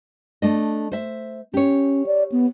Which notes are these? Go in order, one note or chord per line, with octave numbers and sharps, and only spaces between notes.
A3 D4 D#5
C5 E5
C#4 G4 C#5
D5
B3